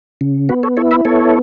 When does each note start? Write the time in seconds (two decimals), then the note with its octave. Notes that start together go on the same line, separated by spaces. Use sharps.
0.21 C#3
0.49 B3 F#4 B4
0.63 A4 C#5
0.77 E4 A4 C#5
0.91 B4 E5
1.05 B3 A4 C#5